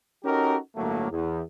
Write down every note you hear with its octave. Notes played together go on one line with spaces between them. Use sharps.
C#4 D#4 F#4 G4 A4 A#4
G1 A2 F#3 A3 A#3
E2